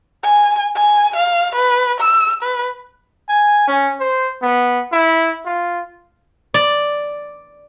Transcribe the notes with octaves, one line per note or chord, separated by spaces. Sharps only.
G#5
G#5
F5
B4
E6
B4
G#5
C#4
C5
B3
E4
F4
D5